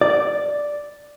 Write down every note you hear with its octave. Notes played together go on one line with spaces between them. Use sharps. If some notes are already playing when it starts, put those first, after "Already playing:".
D5